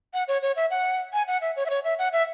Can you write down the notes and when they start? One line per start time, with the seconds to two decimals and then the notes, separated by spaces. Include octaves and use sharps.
0.14 F#5
0.28 C#5
0.42 C#5
0.56 E5
0.71 F#5
1.13 G#5
1.28 F#5
1.41 E5
1.56 C#5
1.66 E5
1.70 C#5
1.84 E5
1.99 F#5
2.13 E5